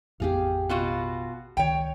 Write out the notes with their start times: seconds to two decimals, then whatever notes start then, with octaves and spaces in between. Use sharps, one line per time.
0.20 A1 F2 B3 G4 G#4 F5
0.69 B2 F4 F#4
1.57 C#2 D#3 C#5 G5